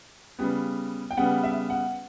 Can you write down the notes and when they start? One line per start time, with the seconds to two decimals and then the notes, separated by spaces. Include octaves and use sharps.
0.39 C#3 G3 B3
1.11 G5
1.17 C#3 G3 B3 F#5
1.43 E5
1.70 F#5